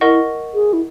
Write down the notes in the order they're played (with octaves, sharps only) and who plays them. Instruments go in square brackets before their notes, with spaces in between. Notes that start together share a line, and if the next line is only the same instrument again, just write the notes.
[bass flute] E4 [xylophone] A#4 D#5 F#5 C#6
[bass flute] G#4
E4